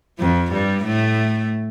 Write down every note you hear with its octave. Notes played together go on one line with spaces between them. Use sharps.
F2 F3
G2 G3
A2 A3